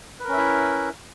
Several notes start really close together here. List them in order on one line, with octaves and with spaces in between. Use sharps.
B4 A#4 C#4 E5 E4